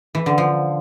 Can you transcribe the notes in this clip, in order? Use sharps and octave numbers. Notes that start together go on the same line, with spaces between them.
E3
D3
F3